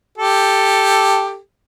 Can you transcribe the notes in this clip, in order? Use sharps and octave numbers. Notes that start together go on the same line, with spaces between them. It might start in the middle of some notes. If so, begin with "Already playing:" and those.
G4 A4